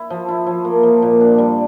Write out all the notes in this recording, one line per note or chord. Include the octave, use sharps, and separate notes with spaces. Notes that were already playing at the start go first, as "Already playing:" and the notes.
Already playing: E4
F3
E4
F3
A#3
F3
A#2
D4
G3